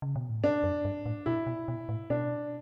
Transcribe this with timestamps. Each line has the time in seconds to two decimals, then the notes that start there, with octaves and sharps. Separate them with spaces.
0.02 C#3
0.16 B2
0.30 A2
0.43 G2 D4
0.63 F#2
0.85 G2
1.06 A2
1.26 B2 E4
1.47 B2
1.68 B2
1.89 A2
2.10 B2 D4